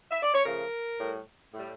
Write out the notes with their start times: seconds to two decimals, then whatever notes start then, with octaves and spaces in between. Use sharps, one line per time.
0.11 E5
0.23 D5
0.34 C#5
0.45 C#3 F3 A3 A#4
0.99 A2 G3
1.54 A2 G3